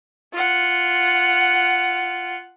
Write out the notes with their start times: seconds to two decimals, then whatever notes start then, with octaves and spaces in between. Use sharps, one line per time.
0.33 F4 F#5